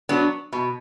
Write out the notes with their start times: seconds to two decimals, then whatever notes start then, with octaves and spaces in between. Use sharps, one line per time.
0.09 F#3 B3 D4
0.53 B2